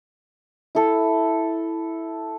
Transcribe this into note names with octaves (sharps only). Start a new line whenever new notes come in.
E4 A4